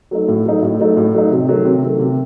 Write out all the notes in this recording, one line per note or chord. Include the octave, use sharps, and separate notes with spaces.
F#3 A3 D#4
A2
F#3 A3 D#4
A2
F#3 A3 D#4
A2
F#3 A3 D#4
C3
D#3 F#3 A3
C3
D#3 F#3 A3
C3